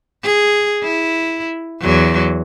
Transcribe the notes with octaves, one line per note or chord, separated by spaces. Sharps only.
G#4
E4
E2 F#3